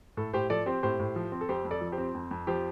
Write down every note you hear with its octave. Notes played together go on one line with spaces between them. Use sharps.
A2 A4
A2 G4 C5
F3 A4 D5
C4 G4 C5
A2 G4 C5
A2
F3
C4
A4
F2 G4 C5
F2
A4 D5
F3
G4 C5
C4
F2
F2
F3 G4 C5